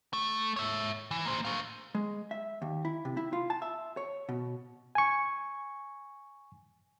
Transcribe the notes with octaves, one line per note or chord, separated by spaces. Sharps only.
A3
C#5 E5
E3
A#3 C5
A3 F5
G#3
E5
D#2
E4
C3
E4
F4
A5
E5
C#5
B2
G#5 C#6